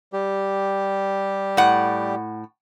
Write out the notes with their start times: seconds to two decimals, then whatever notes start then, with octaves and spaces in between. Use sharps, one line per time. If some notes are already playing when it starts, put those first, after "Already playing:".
0.13 G3 G4
1.57 A2 F#5